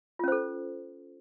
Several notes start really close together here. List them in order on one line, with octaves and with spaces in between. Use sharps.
F4 C#4 C5 A4